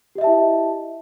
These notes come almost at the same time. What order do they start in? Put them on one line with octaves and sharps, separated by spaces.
G4 D#5 E5 A5 E4